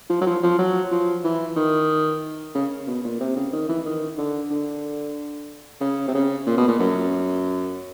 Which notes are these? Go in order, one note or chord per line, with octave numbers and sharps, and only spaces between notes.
F3
F#3
F3
F3
F#3
F3
E3
D#3
C#3
B2
A#2
C3
C#3
D#3
E3
D#3
D3
D3
C#3
C3
C#3
A#2
B2
A#2
F#2